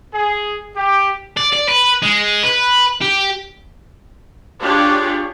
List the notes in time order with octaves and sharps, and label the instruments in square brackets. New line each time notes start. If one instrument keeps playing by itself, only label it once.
[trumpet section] G#4
G4
[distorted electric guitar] D5
D5
B4
G#3
B4
G4
[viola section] D4 F4 G4 G#4 C#5 D5